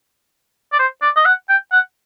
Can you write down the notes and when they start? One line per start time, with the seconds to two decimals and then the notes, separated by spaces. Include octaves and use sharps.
0.73 D5
0.79 C5
1.02 D5
1.16 D#5
1.26 F#5
1.49 G5
1.72 F#5